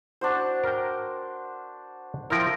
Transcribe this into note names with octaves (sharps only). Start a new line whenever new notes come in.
D4 F#4 C5
A#4 G5
F3 E4 F4 A#4 G5